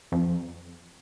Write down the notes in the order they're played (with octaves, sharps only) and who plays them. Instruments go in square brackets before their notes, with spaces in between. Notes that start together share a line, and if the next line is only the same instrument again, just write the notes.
[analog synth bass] F2